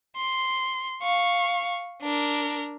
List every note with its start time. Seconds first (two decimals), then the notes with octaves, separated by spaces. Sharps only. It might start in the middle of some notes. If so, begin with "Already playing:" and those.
0.17 C6
1.02 F5 C#6
2.02 D4 A#4